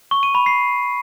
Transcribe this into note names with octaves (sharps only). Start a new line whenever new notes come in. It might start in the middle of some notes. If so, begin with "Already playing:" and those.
C#6
D#7
B5
C7